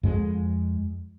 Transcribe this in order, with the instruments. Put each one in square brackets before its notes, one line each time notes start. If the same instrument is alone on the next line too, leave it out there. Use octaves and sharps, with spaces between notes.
[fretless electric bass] F2 G#3